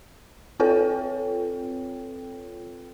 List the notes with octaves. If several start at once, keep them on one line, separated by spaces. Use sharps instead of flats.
C4 F4 A4 B4 C#5 G5